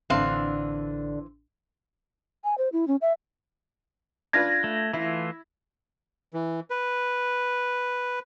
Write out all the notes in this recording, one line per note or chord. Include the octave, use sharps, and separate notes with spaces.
A1 D3 E3 C4 D4 F5
G#5
C5
E4
C#4
E5
D4 F4 B4 G#6 A#6
A3
E3 A3 E4 F4
E3
B4